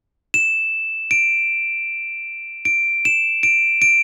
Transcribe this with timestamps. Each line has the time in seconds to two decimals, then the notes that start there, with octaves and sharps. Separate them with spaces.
0.34 E7
1.11 D7
2.65 D7
3.05 E7
3.43 D7
3.82 D7